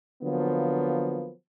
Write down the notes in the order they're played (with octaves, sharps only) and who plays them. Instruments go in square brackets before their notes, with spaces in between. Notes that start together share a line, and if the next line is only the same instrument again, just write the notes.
[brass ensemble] D3 F3 F#3 A#3 B3